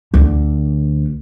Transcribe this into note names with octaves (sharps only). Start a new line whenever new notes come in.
D2 D3